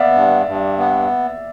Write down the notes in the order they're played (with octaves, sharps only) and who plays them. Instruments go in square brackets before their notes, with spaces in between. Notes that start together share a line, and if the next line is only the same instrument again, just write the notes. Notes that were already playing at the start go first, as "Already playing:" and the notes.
Already playing: [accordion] B3 [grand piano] D5 E5 F5
[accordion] G2
G2
B3